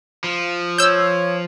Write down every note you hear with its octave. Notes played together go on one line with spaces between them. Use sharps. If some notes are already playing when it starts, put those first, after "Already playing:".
F3
C#5 E6 G6